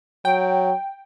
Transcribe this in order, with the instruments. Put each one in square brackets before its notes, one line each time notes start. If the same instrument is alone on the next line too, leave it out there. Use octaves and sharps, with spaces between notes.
[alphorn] F#3 [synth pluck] G5